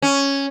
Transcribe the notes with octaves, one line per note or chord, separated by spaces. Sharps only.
C#4